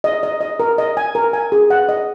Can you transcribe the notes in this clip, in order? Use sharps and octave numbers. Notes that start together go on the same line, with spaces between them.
D#5
D#5
D#5
A#4
D#5
G#5
A#4
G#5
G#4
F#5
D#5